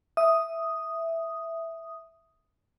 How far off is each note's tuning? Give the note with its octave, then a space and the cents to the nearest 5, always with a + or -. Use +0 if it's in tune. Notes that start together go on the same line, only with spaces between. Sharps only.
E5 +0 D#6 +0